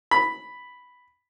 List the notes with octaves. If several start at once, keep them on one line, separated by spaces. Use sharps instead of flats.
B5